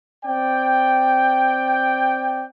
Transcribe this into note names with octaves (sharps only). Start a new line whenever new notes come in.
C4 D5 G5